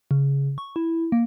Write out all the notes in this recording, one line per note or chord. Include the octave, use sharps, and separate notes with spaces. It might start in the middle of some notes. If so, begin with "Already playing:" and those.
C#3
C#6
E4
A#3